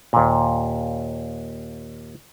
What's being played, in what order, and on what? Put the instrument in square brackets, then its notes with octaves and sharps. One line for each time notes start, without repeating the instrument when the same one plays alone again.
[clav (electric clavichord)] D#2 A#2